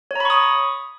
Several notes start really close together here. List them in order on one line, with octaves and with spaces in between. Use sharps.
C#5 A#5 B5 C#6 D#6